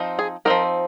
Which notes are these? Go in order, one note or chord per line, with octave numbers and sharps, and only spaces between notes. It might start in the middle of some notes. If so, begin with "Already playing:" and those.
Already playing: F3 C4 D#4
G#4
F3 C4 D#4 A#4